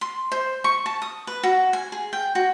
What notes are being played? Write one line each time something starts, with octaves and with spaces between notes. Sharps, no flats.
C6
C5
C#6
A5
D#6
B4
F#4
G#5
G#4
G5
F#4